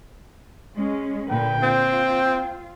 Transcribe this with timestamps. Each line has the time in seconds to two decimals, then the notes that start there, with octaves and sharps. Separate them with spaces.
0.76 G#3 C#4
1.30 A#2 D3 B4 G5
1.63 C4 F4